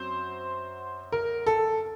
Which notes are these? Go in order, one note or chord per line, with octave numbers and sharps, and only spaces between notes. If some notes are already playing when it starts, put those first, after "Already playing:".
Already playing: F#2 F#3 C4 C5
A#4
A4